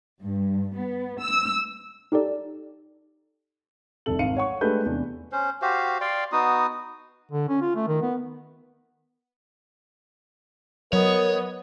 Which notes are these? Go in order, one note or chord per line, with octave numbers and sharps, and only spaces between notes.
G2
B3
E6
D#4 G4 A4 D5
F1 C2 A4 F#7
G#1 F5 C#7 D#7
C#5 F#5 C#6
G#3 A3 D4 G4 B4 G6
E2 C3 D4
C#4 C5
F#4 G4 C5 F5
D5 F5 G5 C6
B3 D#4 F#4 D#6
D3
C#4
F4
A3
D#3
B3
F#3 B3 A#4 C#5 D#5